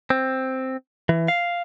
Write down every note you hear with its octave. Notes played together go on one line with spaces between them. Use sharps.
C4
E3
F5